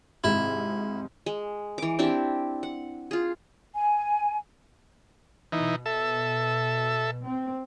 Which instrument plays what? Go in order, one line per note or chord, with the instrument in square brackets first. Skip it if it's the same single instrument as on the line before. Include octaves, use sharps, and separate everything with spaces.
[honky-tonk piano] G#1 G#2 C3 [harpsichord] E4
[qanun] G#3
E3 D6
C4 D4 E4 G4
F#5
F4 G#4
[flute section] G#5
[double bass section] B2 [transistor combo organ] E3 D#4
[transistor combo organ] A4 E5
[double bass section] C4